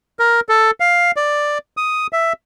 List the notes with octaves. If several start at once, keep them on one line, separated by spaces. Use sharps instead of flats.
A#4
A4
F5
D5
D#6
E5